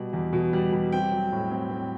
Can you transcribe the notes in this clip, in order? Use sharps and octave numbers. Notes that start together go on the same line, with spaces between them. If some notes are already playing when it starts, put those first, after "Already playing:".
Already playing: B2 G3
E2
B2
G3
G3
C4 G5
F#3
A2
C4
C4